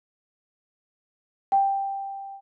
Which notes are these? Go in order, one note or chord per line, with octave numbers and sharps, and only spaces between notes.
G5